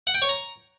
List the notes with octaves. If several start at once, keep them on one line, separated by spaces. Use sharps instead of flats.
F#5
G5
C#5
A#5